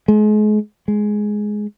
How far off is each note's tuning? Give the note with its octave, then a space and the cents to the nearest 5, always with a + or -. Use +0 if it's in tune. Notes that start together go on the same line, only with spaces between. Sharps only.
G#3 +35
G#3 +10